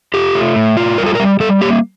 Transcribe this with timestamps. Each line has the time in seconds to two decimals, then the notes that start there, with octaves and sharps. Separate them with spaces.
0.14 F4 G4
0.35 A3
0.56 A2
0.77 F4
0.98 G3 A#4
1.06 A4
1.15 A#4
1.20 G3
1.40 G3 A4
1.61 A#3 G4